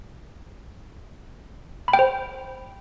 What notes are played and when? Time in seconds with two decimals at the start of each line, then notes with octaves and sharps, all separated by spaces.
1.88 B5
1.93 G5
1.99 C5